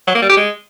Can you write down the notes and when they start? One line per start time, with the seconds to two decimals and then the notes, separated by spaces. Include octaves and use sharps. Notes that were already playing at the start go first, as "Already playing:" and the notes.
0.07 F#3
0.15 A#3
0.22 G3
0.30 G4
0.37 G#3